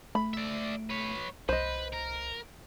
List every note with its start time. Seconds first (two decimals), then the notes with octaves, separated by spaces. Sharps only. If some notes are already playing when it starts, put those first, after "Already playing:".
0.15 A3 B5
0.34 D5 E5
0.90 B4 C#5
1.49 C2 B4 C5 D#5
1.93 A#4